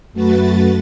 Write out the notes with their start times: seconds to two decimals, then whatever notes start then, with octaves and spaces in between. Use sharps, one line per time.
0.13 F#2 A3 F#4 B4 A6